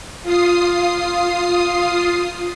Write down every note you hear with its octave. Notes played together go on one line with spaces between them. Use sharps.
F4 D#6 C7